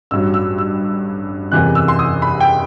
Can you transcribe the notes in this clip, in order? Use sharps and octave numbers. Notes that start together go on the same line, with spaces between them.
A1 G2 F#3 E6
E6
E6
F#1 E2 C3 E3 F#6
E6
C6
D#6
B5
G5